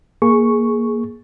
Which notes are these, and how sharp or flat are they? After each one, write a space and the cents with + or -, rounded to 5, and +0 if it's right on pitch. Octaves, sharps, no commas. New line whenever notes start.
A#3 +5 G#4 +10 C#6 +0